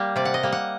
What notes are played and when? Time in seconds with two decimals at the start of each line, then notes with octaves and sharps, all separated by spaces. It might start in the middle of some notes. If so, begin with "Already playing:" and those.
Already playing: G3 A#3
0.16 C3 D5
0.25 F#5
0.34 D#5
0.43 G3 A#3
0.52 F#5